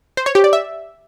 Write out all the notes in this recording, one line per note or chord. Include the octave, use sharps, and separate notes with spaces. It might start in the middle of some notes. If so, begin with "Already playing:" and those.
C5
C#5
G4
D5
E5